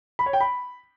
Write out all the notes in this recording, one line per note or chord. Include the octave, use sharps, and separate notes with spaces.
B5
C#5
G5
B5